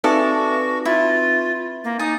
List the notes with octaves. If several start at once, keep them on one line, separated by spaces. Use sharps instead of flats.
C4 D#4 F#4 A4 B4 D5 E5
E4 F4
A#3
D#4 G#5 D#6 A6